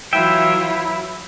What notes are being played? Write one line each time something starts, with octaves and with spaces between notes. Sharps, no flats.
E3 F#3 E4 F4 E5 G5